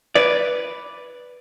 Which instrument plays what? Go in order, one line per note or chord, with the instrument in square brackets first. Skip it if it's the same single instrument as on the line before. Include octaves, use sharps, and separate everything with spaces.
[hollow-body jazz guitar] B4 D5